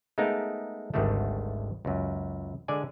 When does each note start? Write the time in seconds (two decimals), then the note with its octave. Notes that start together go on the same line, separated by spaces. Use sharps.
0.18 G#3 A3 B3 D#4 A#4 F5
0.94 G#1 D2 D#3 G3 A3
1.85 C#2 F#2
2.68 D3 G#3 D5 G#5